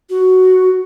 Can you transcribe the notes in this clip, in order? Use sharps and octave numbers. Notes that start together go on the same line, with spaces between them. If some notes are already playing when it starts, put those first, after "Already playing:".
F#4